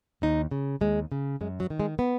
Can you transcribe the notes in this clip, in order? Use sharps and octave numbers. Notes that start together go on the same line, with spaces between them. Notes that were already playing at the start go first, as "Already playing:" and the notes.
D#2 D#4
C#3
D#2 G#3
C#3
F#2 G#3
F#3
D#3
G#3
B3